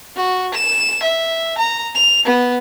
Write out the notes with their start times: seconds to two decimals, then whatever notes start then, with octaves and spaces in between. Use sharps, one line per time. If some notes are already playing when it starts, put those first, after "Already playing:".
0.16 F#4
0.54 E7
1.03 E5
1.58 A#5
1.95 F7
2.25 B3